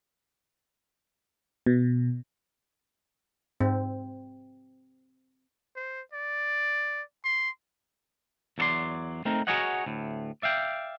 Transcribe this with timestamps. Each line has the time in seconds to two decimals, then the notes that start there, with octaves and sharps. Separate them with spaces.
1.66 B2
3.60 G#2 C4
5.76 C5
6.13 D5
7.24 C6
8.58 E2 F#3 A4 D5 C6
9.25 A3 C4 D#4 A#4
9.47 F#4 G#4 A#4 C#5 D#5 F#5
9.86 D2 A2
10.42 D5 E5 F5 G5